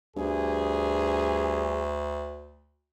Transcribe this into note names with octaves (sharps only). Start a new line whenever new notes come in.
D2 G2 G#4